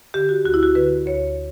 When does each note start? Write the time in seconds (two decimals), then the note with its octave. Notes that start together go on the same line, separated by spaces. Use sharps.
0.14 D3 G4
0.29 F#4
0.45 D2 F#4
0.54 E4
0.63 F#4
0.75 D3 B4
1.06 D2 C#5